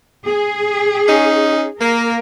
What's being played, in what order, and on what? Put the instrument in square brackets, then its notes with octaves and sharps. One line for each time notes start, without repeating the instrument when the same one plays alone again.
[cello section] G#4
[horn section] C#4 D#4
[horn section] A#3 [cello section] A#4